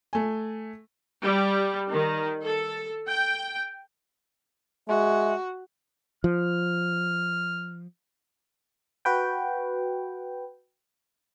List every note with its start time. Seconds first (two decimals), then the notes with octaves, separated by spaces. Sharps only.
0.13 A3 G#5
1.22 G3
1.90 D#3
2.43 A4
3.08 G5
4.88 G#3 F#4 E5
6.24 F3 F6
9.05 F#4 B4 G5